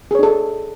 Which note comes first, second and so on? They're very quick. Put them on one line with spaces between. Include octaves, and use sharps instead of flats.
G#4 C#5 D4 A4